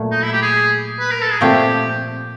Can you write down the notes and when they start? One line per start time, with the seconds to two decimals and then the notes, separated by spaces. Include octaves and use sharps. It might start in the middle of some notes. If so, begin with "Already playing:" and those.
Already playing: A#2 F#3 A3
0.11 D#4
0.22 E4
0.32 G4
0.42 G#4
1.00 B4
1.11 A#4
1.21 A4
1.31 G#4
1.40 A#2 F3 A3 C4 G4